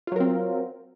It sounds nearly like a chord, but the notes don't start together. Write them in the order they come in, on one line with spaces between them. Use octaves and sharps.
F4 F#3 A#4 C4